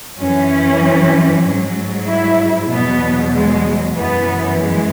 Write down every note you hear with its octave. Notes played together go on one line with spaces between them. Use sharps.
F#2 E3 C#4
G#2 F#3
E4
E2 B2 F#3 B3
G#3
F#2 E3 B3
G#3